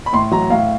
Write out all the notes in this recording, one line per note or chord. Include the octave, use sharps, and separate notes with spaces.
B5
A2 C6
F#3 A#5
A2 F5